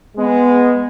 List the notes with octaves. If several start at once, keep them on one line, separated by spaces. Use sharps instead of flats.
G#3 B3